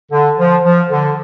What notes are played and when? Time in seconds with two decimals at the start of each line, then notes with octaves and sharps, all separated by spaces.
0.11 D3
0.39 F3
0.64 F3
0.91 D3